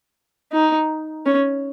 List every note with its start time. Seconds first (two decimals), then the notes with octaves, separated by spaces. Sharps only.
0.52 D#4
1.26 C#4